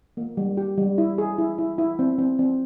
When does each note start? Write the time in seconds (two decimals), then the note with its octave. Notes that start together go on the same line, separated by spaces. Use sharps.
0.17 A#3
0.37 G3
0.57 G4
0.78 G3
0.98 E4
1.18 G#4
1.38 E4
1.58 E4
1.78 E4
1.99 C4
2.19 C4
2.39 C4